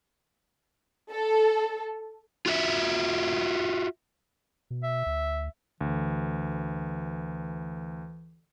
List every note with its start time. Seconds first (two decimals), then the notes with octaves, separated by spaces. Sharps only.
1.12 A4
2.46 F4 F#4 E5
4.70 B2
4.83 E5
5.06 D2
5.81 D2 E3